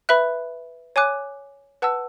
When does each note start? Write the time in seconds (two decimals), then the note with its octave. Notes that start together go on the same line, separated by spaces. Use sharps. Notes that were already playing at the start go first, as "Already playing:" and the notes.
0.09 B4 E5 B5 F#6
0.96 C#5 G#5 D6 F#6
1.82 B4 F#5 A5 E6